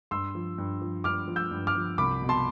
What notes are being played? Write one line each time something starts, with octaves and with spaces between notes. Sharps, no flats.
G2 C6 E6
F3
G2
F3
G2 D6 F6
F3
E6 G6
G2
D6 F6
F3
C2 B5 D6
B2
A5 C6